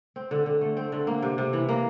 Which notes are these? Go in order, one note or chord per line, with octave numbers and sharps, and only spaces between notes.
C4
D3
D3
A3
C4
D3
A#3
C3
C3
E3
A#3